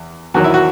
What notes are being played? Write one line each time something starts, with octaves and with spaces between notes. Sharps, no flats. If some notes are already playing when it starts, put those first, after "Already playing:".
Already playing: E2
E2 D#3 F#3 F#4
E4
F#4